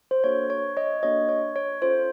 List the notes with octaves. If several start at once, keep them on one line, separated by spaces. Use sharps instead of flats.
C5
A#3 D4 F#4 A4 C#5
C#5
C#5 D#5
A#3 D4 F#4 A4 C#5 D#5
C#5
C#5
C#4 F4 A4 C5